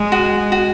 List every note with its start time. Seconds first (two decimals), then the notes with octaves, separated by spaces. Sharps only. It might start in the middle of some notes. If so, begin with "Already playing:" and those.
Already playing: G#3
0.12 F#4
0.52 F#4